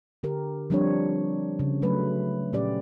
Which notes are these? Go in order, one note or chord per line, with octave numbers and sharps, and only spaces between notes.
D3 G4 A#4
F3 G3 C4 D4 G4 C#5
C#3
F#3 A3 B4
A#2 C#4 G4 D5